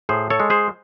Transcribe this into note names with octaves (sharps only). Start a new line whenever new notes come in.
A2 G#4 C5
A4 C#5
G#3
G#4 C5